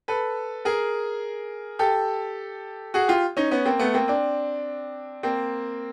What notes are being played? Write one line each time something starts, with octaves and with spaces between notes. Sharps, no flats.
A4 B4
G#4 A#4
G4 A4
F#4 G#4
F4 G4
C#4 D#4
B3 C#4
A#3 C4
A3 B3
A#3 C4
C4 D4
A#3 C4